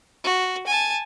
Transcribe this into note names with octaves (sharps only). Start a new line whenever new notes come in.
F#4
G#5 A5